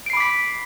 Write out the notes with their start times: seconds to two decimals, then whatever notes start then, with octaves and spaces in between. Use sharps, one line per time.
0.06 D7
0.10 C7
0.13 B5
0.17 D6
0.20 B6